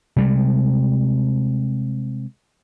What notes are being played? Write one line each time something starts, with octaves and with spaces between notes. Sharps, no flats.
C3 G3 G#3